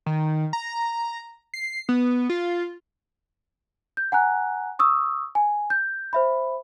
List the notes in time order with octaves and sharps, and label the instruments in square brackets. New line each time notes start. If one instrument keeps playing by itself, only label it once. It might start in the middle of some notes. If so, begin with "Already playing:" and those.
[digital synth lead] D#3
A#5
C7
B3
F4
[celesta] G6
F#5 G#5 A#5 F#6
C#6 D#6 E6
G#5
G6
C5 E5 B5